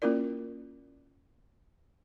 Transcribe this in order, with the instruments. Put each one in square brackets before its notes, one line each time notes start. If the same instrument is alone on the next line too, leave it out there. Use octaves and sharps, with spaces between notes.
[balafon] A#3 C#4 E4 F4 A#4 D5